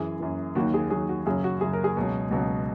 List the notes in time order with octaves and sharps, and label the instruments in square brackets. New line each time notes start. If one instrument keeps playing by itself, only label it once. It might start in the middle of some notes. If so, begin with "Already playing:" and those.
Already playing: [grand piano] F#2 E3 G#4
F#2 E3
D#2 D#3 F#3 F#4
G#4
D#2 D#3 F#3 G#4
F#4
F#2 C#3 F#3 G#4
F#4
F#2 C#3 F#3 G#4
A#4
G#4
C#2 B2 F#3
C#2 B2 F#3